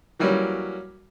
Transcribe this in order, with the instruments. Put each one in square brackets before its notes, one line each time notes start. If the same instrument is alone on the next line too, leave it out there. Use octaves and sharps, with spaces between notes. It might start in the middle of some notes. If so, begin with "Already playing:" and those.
[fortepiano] E3 F#3 G3 A#3 C#4